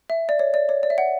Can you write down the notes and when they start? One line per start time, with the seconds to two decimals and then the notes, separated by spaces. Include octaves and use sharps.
0.10 E5
0.29 D5
0.39 C#5
0.54 D5
0.69 C#5
0.83 D5
0.90 E5
0.98 F#5